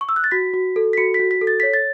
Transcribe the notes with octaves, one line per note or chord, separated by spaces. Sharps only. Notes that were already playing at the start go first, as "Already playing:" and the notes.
C#6
E6
F#6
A6
F#4 B6
F#4
A4
B6
F#4 C#7
B6
F#4
B6
A4
A6
C#5 B6
A6